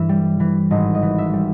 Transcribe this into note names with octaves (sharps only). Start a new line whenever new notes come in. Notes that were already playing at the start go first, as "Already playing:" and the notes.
Already playing: G2 E3 E5
G3
E3
G#1 D#5
D#5
E3
E5
G3